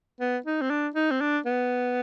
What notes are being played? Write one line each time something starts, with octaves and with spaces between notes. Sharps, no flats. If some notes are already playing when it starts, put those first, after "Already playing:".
B3
D#4
C4
D4
D#4
C4
D4
B3